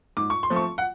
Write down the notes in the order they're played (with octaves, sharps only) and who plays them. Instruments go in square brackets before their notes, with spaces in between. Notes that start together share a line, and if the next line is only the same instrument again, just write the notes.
[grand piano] G#2 D6
C#6
C6
F3 A3 C4
C#6
F#5